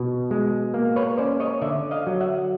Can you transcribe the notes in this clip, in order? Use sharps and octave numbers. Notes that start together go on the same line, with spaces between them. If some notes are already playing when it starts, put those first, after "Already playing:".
Already playing: B2
G#3
A#3
B4 C#5
C#4 C5 D5
C#5 D#5
D3 D5 E5
D#5 F5
F#3
E5 F#5